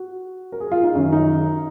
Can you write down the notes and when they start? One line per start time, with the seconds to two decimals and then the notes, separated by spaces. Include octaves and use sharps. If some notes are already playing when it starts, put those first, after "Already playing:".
Already playing: F#4
0.52 A#4
0.60 G#4
0.72 F4
0.83 D#4
0.95 F#2 D#3 C#4
1.12 D#4